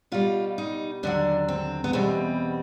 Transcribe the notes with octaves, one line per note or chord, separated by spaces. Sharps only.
B2 G3 F4
D#4
D#2 D3 F#3 D4
C4
B3
E2 B2 G3 C4